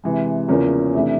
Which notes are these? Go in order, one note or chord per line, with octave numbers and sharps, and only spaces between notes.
C3 E3 G#3
E2 C#3 F3 A#3 C#4
C3 E3 A3 D4